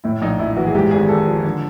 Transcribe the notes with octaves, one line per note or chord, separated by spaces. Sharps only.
A2 E4
A#1 D#4
A#1 E4
E3 F#4
G#4
G#2 G4
G#1 G#4
G#1 A4
F3
D3